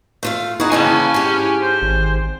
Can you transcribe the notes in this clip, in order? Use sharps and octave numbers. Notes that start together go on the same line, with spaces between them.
A3 F4 F5
D#4 E4 F#4 G#4
C#3 E3 A#3 C#4 E4 G#5 A5
G#2 G4
C5
G#1